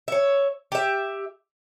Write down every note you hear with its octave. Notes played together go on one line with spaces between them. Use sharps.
C#5 E5
G4 E5